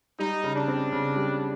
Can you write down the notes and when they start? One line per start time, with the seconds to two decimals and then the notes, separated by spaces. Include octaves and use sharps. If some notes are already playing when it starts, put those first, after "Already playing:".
0.19 G3 D#4
0.44 C#3
0.55 D4
0.68 C4
0.92 C#3
1.16 G3